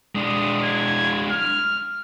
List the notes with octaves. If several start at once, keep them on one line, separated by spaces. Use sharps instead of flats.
G#3 D4 D#6
G#6
F6